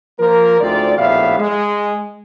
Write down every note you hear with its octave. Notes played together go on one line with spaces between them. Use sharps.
F3 A#3 A#4
D2 G#2 C4 F4 D5
A#1 A2 B3 G4 E5 F5
G#3